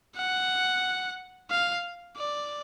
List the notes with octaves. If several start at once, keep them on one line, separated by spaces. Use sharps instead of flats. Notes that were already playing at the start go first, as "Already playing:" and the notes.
F#5
F5
D5